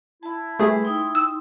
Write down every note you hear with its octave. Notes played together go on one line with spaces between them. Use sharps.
E4 A5 B5
G3 A3 G#4 B4
D#4 G5 C6
E6